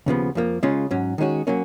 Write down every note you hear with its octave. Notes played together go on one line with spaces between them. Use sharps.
D#2 C#3 F3 B3
F2 F3 A#3
C#3 G#3 C#4 F4
G#2 F#3 C#4
D#3 G#3 C#4 F#4
F#3 A#3 C#4